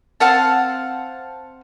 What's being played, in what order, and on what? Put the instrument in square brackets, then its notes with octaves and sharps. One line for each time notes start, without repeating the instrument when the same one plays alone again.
[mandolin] C4 F5 F#5 A5